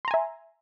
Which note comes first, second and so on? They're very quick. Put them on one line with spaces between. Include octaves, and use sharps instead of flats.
C6 A#5 G#5 E5